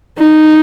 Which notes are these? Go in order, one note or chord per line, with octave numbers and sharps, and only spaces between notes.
D#4